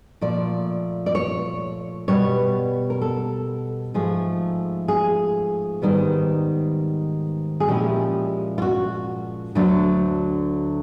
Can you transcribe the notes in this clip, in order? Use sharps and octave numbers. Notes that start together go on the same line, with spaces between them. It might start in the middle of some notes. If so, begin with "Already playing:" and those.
A#2 F3 A3 D5
D5
C#5
B2 G3 B3 C#5
A#4
A4
G#2 F3 A3 G#4
G#4
G#2 D#3 G3 B3
G#4
A#2 F3 G#3 C#4 E4 G4
F4
F#4
D2 D3 F#3 A3 D4